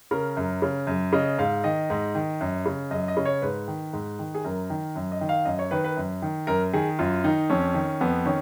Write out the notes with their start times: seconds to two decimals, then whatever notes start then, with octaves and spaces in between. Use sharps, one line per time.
0.11 C#3 A#4
0.37 F#2
0.62 C#3
0.87 F#2
1.13 C#3 D#5
1.38 G#2 F5
1.64 D#3 D#5
1.90 G#2
2.15 D#3
2.41 F#2
2.66 C#3
2.91 F#2 D#5
3.08 D#5
3.17 C#3
3.25 C#5
3.42 G#2 B4
3.68 D#3
3.93 G#2
4.19 D#3
4.35 G#4
4.44 F#2 A#4
4.70 D#3
4.96 F#2
5.12 D#5
5.21 D#3
5.29 F5
5.45 F#2 D#5
5.59 C#5
5.71 D#3 B4
5.84 B4
5.97 F#2
6.22 D#3
6.47 F#2 A#4
6.73 D#3 G#4
6.99 F#2 F4
7.24 D#3 D#4
7.50 F2 C#4
7.74 D#3
8.01 F2 B3
8.25 D#3 C#4